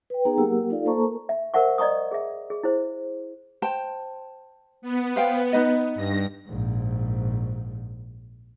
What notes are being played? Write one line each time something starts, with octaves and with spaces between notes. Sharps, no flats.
B4 G5
B3 D#4 G#4 G5 A#5
F#3 A#3 G4 A#4 F#5 E6
D#4 F4 A4 D5 F5
A#3 A4 C5 A5 A#5 C#6
A#4
E5
A#4 C5 E5 F#5 C#6
D5 D#5 A#5 C#6 D#6
G#4 E5
G#4
E4 G#4 C5
C5 G5 A5
B3
C5 F5 G5
D#4 B4 D#5
G2 A#6
A#1 G#2